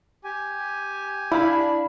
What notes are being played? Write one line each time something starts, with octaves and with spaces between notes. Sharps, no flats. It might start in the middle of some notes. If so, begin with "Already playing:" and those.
G4 G#5
D4 E4 F5 B5